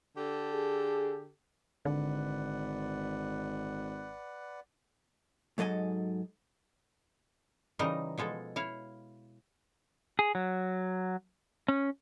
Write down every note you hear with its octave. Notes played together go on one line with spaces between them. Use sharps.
D3 G4 A4
G#4
G#1 D3 B4 D5 F#5
G#2 F#3 A4 D#5 G#5
C#3 E3 G3 D#4 A#4 D#5
B2 F3 G#3 A4
E4 C#5 F5
G#4
F#3
C#4